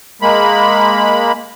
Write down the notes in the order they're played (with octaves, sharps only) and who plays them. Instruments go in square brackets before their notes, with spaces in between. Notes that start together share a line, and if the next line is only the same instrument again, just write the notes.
[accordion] G#3 A#3 B5